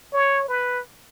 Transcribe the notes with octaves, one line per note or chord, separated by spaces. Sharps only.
C#5
B4